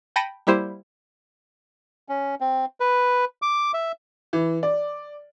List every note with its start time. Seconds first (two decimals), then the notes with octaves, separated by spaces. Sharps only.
0.16 G5 A5 B5 A#6 C#7 D#7
0.47 G3 A#3 E4 G4 C5
2.09 C#4
2.41 C4
2.80 B4
3.42 D6
3.74 E5
4.33 E3
4.63 D5